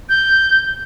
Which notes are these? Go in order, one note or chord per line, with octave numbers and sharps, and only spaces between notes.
G6